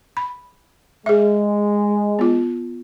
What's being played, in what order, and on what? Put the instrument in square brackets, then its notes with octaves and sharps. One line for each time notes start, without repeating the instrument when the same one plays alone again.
[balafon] B5
[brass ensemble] G#3 [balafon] G#4 E5
[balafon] B3 F4